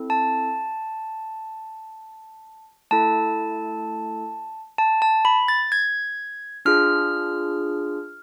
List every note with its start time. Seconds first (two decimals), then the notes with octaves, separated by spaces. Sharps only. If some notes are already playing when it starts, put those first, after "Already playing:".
Already playing: C4 E4 A4
0.10 A5
2.91 A3 E4 A4 A5
4.78 A5
5.02 A5
5.25 B5
5.48 A6
5.72 G#6
6.65 D4 F4 G#4 F6